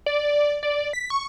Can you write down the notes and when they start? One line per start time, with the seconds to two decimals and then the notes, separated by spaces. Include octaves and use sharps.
0.06 D5
0.63 D5
0.93 B6
1.10 C#6